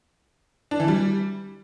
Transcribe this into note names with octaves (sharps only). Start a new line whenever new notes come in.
D4
E3
G3